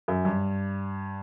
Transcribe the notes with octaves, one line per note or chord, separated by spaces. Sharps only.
F#2
G2